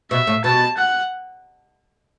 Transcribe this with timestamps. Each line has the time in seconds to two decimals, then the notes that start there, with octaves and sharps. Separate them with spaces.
0.11 B2 E5
0.27 A2
0.44 B2 A5
0.77 F#5